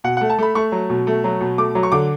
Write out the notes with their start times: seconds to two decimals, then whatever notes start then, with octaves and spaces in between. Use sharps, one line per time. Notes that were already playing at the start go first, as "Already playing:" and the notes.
0.04 B2 F#5
0.17 A3 F#5
0.30 A5
0.39 A3 B5
0.55 A3 C#6
0.72 F#3
0.90 B2
1.07 A3
1.24 F#3
1.41 B2
1.58 A3 D6
1.75 F#3
1.83 C#6
1.92 D3 D6